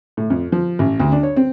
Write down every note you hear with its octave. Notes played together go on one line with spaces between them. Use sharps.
A2
F2
F3
A1
D2
D4
C#5
C4